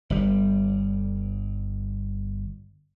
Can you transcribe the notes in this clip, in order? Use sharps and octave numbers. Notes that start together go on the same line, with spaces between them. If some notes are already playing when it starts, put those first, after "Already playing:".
G1 G3